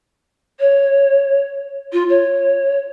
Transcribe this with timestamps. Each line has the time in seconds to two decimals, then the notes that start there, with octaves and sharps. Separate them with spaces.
0.60 C#5
1.92 F4
2.09 C#5